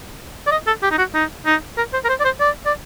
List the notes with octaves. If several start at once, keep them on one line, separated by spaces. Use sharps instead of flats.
D5
D#5
A4
G4
D#4
F#4
D#4
D#4
A#4
C5
A#4
C5
D5
C5
D5
D5